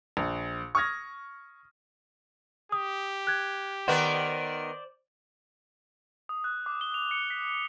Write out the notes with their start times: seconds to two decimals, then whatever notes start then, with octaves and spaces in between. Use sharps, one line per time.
0.17 A#1
0.75 C#6 D#6 F6 G#6 A#6
2.72 G4 D#6
3.27 F#6 G#6
3.88 D#3 B3 A#4 C5 D5 F#5
6.29 D#6
6.44 F#6
6.66 D6
6.81 G7
6.94 F7
7.11 C#7
7.30 B6